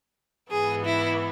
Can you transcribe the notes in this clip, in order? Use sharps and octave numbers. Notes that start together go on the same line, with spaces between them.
G#2 E3 B3 G#4
E4